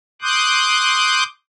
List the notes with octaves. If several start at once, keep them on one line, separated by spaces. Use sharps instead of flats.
C6 D6 D#6 F#6 G6